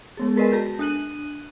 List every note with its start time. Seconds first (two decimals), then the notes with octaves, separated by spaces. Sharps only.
0.17 G#3 B3 G#4
0.36 G#4 A#4 B4 D5 D#5 G#5
0.52 F#4 A4 A5
0.79 D4 G#5 F#6 D#7 F#7